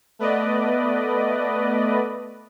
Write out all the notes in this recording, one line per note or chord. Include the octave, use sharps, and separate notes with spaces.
A3 B3 B4 D5 D#5